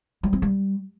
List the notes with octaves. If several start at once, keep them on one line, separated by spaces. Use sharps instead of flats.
G3
C4
G3